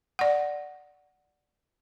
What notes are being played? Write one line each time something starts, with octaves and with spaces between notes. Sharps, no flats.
D5 F#5